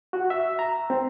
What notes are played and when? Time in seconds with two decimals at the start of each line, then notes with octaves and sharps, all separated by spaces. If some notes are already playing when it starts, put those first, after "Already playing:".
0.13 F#4
0.30 E5
0.59 A#5
0.90 C4